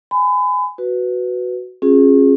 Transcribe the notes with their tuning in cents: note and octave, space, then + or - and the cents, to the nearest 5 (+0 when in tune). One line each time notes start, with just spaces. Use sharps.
G#5 +0 B5 +35
F#4 +0 B4 +0
C#4 -30 F4 +35 G#4 +0